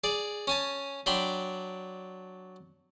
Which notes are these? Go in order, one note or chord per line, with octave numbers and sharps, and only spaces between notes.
G#4 D5
C#4 G#5 A5
F#3 D4 G5 B5 C6